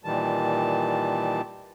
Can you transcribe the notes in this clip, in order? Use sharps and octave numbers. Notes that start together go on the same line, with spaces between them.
A#2 D#3 E3 G3 A5